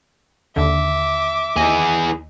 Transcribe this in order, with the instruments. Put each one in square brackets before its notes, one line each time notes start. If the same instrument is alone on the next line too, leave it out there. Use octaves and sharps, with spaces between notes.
[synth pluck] D#2 D3 [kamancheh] E5 D6
[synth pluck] D#2 D#5 [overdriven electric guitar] E3 G#4